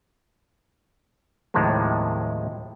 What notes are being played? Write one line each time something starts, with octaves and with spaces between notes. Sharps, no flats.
D#2 A2 C3 D#3 F3 G#3